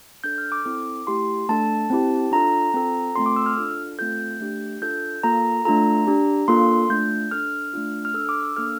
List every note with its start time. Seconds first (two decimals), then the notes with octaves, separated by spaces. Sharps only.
0.24 D4 A4 G6
0.38 F6
0.52 D6
0.65 C4 E4 A4
1.07 A3 E4 G4 C6
1.49 A3 D4 A4 A5
1.90 C4 E4 G4
2.32 D4 F4 A4 A#5
2.74 C4 F4 A4
3.15 A3 C4 F4 A4 C6
3.26 D6
3.36 E6
3.46 F6
3.57 D4 F4 A4
3.99 A3 C4 F4 A4 G6
4.40 A3 D4 G4
4.81 D4 F4 A4 G6
5.23 A#3 F4 A4 A#5
5.65 A3 D4 F4 A4 A#5
6.07 D4 G4
6.48 A#3 D4 F4 A4 C6
6.89 A3 D4 F4 G6
7.31 D4 A4 F6
7.73 A3 D4 F4
8.05 F6
8.14 D4 A4 E6
8.29 D6
8.43 E6
8.56 A#3 D4 A4 F6